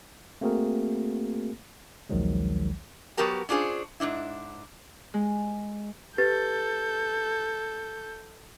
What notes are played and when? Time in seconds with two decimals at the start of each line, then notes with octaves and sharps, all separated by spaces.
0.41 A3 A#3 C4 F#4 G#4 A#4
2.09 A#1 D#2 D#3 F3 F#3 G#3
3.17 F#3 B3 F#4 G4 A#4 A5
3.49 C#4 D4 F4 G#4 C5
4.00 G#2 C3 D4 E4
5.14 G#3
6.18 G4 A4 B4 G6 A6